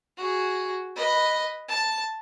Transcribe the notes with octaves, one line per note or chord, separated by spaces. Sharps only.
F#4 G#4
B4 D#5
A5